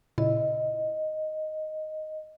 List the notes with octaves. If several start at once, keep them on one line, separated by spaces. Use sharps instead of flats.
A#2 C#3 E4 D#5